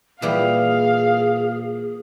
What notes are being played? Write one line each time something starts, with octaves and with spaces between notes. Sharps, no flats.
A#2 E3 G3 G#4 F5